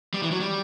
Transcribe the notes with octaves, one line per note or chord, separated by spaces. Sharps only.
G3
E3
F#3
G3